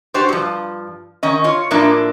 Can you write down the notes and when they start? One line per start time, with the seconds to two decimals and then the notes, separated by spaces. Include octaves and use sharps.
0.14 D4 F#4 G4 C5
0.29 G2 F3
1.23 D#3 C#4 D#5
1.44 F4 C#5
1.71 A2 F3 A#3 D4 E4